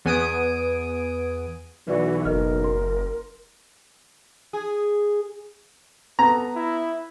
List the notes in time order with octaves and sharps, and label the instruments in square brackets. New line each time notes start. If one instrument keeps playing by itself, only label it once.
[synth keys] E2 B3 G#5 D#6 D7
[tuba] B1 [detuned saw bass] E3 [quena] F#4 [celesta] B4 D5
[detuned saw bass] F#1 [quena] A#4 [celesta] D#5 F6
[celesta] C6
[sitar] G#4
[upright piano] B3 [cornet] A4 [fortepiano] A#5
[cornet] E4